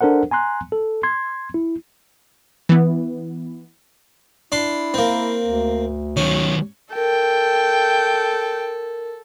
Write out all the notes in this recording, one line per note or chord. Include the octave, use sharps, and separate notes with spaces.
D4 A4 A#4 C5 F#5
G#5 A#5 C6 F#6
A4
C6 G#6
E4
E3 B3
D4 E4 C6
A#3 C4
D2
D#3 F#3 C#4
A4 A#4 G5